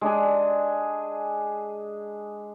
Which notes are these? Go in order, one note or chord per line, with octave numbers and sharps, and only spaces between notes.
G#3 D4 G#4